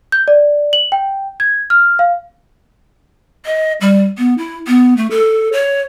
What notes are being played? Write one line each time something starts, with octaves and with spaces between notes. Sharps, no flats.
G6
D5
F#7
G5
G#6
F6
F5
D#5
G3
B3
E4
B3
A3
A4
C#5